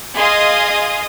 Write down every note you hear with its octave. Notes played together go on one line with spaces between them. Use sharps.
G#4 D#5 F5 C6 D#6